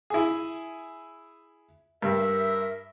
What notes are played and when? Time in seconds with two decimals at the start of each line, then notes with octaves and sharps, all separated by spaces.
0.10 E4 G#4
2.02 G2 A#4 E5